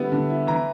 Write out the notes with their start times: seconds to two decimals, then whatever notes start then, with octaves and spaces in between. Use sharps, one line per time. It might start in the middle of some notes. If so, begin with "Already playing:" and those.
Already playing: D3 G3 B3 E4
0.12 D3
0.30 E4
0.47 E3 A#5